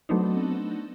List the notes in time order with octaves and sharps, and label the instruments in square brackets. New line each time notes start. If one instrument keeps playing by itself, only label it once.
[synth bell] F#3 A3 B3 C4 D4 D#4